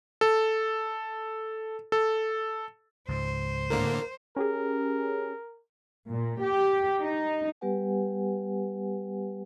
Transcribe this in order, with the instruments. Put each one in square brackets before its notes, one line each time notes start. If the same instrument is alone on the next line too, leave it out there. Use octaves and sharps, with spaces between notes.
[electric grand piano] A4
A4
[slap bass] C#2 G#2 [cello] C5
[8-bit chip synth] A2 D3 A#3 [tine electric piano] A#4
[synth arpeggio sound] C#4 G4 G#4 [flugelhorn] A#4
[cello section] A#2
G4
D#4
[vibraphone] G3 B3 G4 B4 F#5 G#5